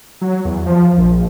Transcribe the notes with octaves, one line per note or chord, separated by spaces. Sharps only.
F#3
E2
F3
A#1